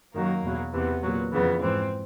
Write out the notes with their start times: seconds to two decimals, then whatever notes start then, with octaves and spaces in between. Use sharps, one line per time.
0.14 F#2 D#3 F#3 A#3
0.44 E2 B2 F#3
0.73 E2 C3 E3 B3
1.03 A#2 F#3
1.32 F2 C#3 E3 B3
1.62 G#2 E3 C4